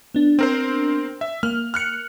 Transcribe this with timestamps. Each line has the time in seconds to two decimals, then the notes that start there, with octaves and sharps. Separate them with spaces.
0.14 B3 D4
0.39 C4 A#4 C5
1.21 E5
1.43 A#3 F6
1.74 F6 F#6 C#7